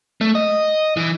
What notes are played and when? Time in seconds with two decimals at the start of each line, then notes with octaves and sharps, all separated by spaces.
0.21 A3
0.35 D#5
0.97 E3